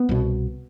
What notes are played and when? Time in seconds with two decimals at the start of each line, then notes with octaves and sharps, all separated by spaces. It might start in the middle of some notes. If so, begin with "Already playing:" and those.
Already playing: B3
0.09 C2 B2